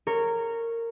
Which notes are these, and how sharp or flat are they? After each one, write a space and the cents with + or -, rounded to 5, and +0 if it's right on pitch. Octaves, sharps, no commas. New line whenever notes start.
A#4 -15 C#5 -5